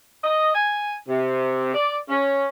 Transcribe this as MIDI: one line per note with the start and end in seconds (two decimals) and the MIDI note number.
0.24 0.54 75
0.54 0.95 80
1.08 1.73 48
1.74 1.97 74
2.08 2.47 61